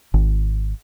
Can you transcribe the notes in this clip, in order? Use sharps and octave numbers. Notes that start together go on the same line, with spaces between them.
G#1